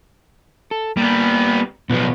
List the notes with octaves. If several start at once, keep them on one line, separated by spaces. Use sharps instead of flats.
A4
G3 A#3 B3
B1 F3 B3 F4 B4